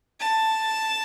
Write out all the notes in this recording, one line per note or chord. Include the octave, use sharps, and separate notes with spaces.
A5